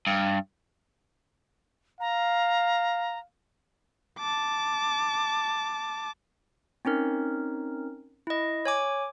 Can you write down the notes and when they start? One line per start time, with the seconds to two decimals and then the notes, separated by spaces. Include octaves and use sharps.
0.07 G2
2.00 F5 A#5
4.19 A5 D6
6.85 C4 C#4 D#4 A#4
8.27 E4 D#5
8.66 C#5 G#5 D6